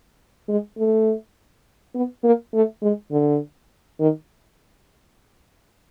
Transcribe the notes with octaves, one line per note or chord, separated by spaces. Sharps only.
G#3
A3
B3
A#3
A3
G#3
D3
D#3